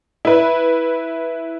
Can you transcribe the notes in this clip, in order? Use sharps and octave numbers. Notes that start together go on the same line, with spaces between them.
E4 B4